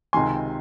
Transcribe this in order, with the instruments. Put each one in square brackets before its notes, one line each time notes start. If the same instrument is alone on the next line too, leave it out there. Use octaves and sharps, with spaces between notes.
[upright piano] C#2 C3 D#3 G#5 C6